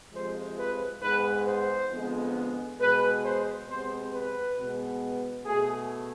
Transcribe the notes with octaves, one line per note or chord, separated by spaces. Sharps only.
F2 C3 F3 G#3 C5
B4
G#2 G#3 B3 B4
C5
F2 D3 G#3 B3
B2 G#3 B3 B4
C5
C3 G#3 B3 C5
B4
B2 G#3 B3
B2 A3 G#4